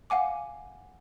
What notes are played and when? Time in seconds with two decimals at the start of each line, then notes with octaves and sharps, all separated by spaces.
0.10 F5 F#5 G#5 D6